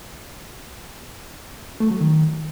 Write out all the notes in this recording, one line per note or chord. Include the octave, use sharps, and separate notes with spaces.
A3
F#3
D#3